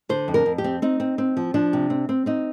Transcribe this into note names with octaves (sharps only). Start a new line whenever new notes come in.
D3 C5
F2
A#4
F2
G4
C4
C4 D#4
C4
C4
F3
F3 D4
C3
C4
C4
C4 D#4